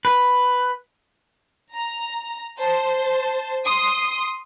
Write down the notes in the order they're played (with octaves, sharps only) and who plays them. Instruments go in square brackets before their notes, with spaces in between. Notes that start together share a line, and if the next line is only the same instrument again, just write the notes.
[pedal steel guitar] B4
[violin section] A#5
C5 A5
C6 D#6